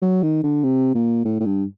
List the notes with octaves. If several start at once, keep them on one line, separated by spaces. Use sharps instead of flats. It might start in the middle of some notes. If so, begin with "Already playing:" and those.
F#3
D#3
D3
C3
A#2
A2
A2
G2